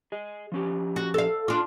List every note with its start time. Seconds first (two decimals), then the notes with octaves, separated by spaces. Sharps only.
0.12 G#4 D#5
0.52 F3 C#4 G4
0.96 F#4
1.14 A4 F5
1.48 D4 F4